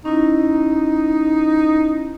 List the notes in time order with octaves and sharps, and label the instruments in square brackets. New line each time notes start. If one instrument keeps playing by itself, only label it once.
[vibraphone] C#4 E4 [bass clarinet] D#4